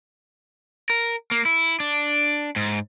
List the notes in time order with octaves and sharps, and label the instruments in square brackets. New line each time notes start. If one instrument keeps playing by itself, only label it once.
[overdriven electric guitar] A#4
A#3
E4
D4
G#2